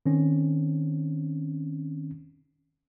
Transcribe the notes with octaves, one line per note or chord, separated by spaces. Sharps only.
D#3 C4 C#4